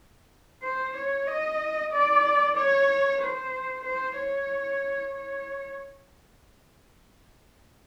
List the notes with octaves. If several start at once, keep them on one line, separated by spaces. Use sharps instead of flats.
C5
C#5
D#5
D5
C#5
C5
C5
C#5
C#5